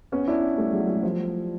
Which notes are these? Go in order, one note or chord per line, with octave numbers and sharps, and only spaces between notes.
B3 C#4
D4 E4
G3 A3
F#3 G#3
F#3 G#3
F3 G3